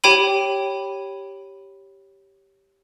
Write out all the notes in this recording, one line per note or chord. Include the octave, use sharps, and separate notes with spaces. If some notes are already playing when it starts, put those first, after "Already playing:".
G4 C#5 G5 B5 D#7